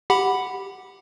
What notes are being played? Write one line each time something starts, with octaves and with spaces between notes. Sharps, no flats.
G4 F#5 B5